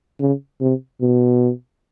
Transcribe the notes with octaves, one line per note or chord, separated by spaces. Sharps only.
C#3
C3
B2